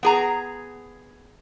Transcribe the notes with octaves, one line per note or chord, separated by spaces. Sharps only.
B3 G#4 A#5